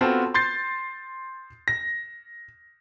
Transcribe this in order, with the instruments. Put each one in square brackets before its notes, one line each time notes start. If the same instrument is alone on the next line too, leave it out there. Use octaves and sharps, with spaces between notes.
[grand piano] B3 C4 F4 F#4 A4
C6 G6 A6 C7
A#6